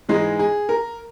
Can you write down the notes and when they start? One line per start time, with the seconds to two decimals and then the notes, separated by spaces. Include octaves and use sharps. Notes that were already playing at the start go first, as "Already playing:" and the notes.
0.09 G#2 E3 G#3 D#4 G#4
0.39 G#4
0.69 A#4